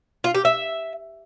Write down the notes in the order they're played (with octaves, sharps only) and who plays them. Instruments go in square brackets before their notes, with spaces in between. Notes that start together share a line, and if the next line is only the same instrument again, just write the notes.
[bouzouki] F4
G4
E5